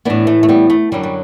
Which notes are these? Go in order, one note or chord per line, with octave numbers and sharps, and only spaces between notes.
A2 E3 B3 D4
A3
A3
G3 B3
A3
F#2 D3 F#3 G3
G3